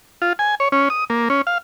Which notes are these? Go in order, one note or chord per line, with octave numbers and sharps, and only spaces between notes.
F4
G#5
C#5
C#4
D#6
A#3
C#4
F5